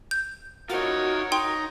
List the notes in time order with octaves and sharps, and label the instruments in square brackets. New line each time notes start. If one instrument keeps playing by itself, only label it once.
[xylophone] G6
[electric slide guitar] D#4 F4 [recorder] F#4 [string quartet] A#4 C#5
[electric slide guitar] D#4 [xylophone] G5 C6